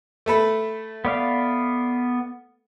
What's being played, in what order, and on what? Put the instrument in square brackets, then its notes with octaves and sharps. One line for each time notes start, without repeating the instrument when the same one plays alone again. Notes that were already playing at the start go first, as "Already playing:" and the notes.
[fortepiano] A3 A4 B4
[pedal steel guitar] B3 D5 F5